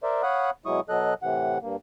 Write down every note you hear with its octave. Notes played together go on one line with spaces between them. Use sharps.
A#4 C5 D5 E5
C#5 F5 F#5 B5 D#6 F#6
B2 F#3 G#3 E4 C#6 D#6
B2 F#3 A4 D#5 F#6
A2 C3 E3 F#5
G2 A#3